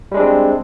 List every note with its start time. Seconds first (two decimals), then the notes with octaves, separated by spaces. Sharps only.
0.12 G3
0.14 G#3
0.17 D4
0.19 C4